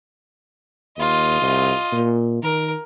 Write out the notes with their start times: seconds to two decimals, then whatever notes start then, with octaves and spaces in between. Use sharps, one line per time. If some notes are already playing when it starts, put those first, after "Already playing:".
0.98 D#2 F4 D#5
1.42 C2
1.93 A#2
2.43 D#3 A#4